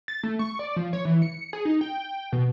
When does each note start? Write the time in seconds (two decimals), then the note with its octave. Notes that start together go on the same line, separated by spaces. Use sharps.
0.08 A6
0.23 A3
0.39 C#6
0.59 D5
0.76 F3
0.93 C#5
1.05 E3
1.22 C#7
1.53 G#4
1.65 D#4
1.81 G5
2.32 B2